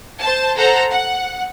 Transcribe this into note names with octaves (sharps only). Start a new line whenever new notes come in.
C5 A5
A4 C5 F#5 A#5
F#5